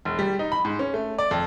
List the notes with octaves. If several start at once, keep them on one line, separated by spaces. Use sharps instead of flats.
E1
G3
D#4
B5
G#2
C#4
A3
D5
F2